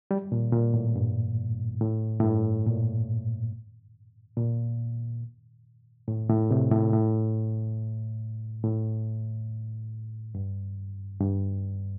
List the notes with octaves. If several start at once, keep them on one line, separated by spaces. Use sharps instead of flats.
G3
A#2
A#2
A2
G2
A2
A2
G2
A#2
A#2
A2
A2
C3
A2
A2
A2
G2
G2